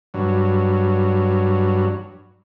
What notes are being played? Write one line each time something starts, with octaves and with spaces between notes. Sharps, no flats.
G2 F#3